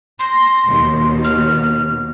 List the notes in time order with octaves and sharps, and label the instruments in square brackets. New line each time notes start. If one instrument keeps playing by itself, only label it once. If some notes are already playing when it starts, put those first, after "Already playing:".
[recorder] C6 [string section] A#6
[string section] D#2 B2
[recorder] F6